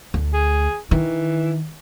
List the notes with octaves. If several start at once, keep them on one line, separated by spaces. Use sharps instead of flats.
D2
G#4
D#3 E3